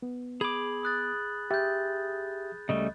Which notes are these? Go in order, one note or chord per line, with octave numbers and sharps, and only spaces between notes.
B3
G#4 B5 D6 G#6 F#7
D#6 F#6 A6
G4 E5 G6 A6
C#2 C#3 G3 A3 D#5